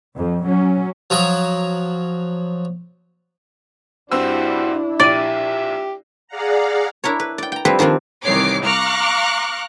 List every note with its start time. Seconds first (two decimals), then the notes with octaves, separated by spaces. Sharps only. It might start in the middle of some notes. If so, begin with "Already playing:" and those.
0.19 F2
0.49 F#3 C#4
1.10 F3 F#3 A#5 D#6
4.12 G2 G3 C4 D4 E4 F#4 C5 E6
5.00 A#1 G4 D5 E5 D#7
6.27 G#4 D5 F5 F#5 A#5
7.04 D4 E4 A#4 C#5
7.20 B4
7.38 D5 G5
7.52 G5 A#5
7.65 F3 G3 C4 E4 B4 C5
7.79 D#3 F3 G3 C4 D4
8.23 C2 D#3 E3 C#5 D6 C7
8.63 F5 A#5 C#6 D6 F6 F#6